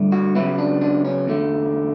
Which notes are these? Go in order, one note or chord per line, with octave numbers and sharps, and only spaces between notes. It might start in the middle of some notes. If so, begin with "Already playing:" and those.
Already playing: G2 D3 A3
F#4
C#3 F#3 B3 E4
D4
D4
C#4
E2 D3 A3